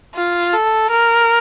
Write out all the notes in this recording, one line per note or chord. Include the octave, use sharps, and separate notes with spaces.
F4
A4
A#4